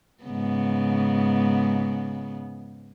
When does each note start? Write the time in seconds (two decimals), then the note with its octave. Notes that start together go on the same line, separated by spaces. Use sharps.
0.24 G#2 C#3 B3